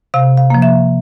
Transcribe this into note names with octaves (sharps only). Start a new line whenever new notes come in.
C3 F5
F5
F3 A#3
E5